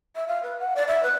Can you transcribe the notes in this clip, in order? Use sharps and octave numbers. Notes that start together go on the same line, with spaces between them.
E5
F5
B4
F#5
D5
E5
B4